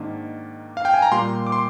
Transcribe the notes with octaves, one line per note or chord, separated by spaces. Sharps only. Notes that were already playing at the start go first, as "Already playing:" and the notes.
Already playing: G#2 D#3 A#3 D4
F5
G5
G#5
A#5
A#2 G3 A#3 C6
D6
C6